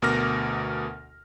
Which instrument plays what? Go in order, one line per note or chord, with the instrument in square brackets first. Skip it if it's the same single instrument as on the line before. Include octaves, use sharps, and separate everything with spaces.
[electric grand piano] D2 B2 A#4 D6 F6 A#6